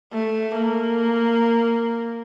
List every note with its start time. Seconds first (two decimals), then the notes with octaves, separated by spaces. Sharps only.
0.14 A3
0.55 A#3